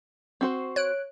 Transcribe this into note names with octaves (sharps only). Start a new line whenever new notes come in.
C4 F#4 C5
C#5 F#6 D7